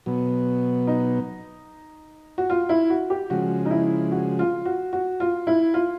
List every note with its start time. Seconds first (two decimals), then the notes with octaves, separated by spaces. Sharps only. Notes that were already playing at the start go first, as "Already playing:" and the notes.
0.06 B2 F#3 B3
0.87 D#4
2.38 F#4
2.50 F4
2.69 E4
2.90 F#4
3.10 G4
3.30 C#3 F3 G#3 F#4
3.65 D#4
3.71 E4
4.12 F#4
4.39 F4
4.65 F#4
4.93 F#4
5.20 F4
5.47 E4
5.74 F4